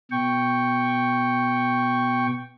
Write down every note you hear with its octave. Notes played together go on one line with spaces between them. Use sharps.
B2 G5 C#6